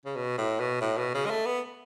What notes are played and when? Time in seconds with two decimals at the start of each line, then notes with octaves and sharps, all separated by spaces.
0.06 C#3
0.16 B2
0.38 A2
0.60 B2
0.81 A2
0.98 B2
1.14 C#3
1.26 G#3
1.30 A3
1.46 B3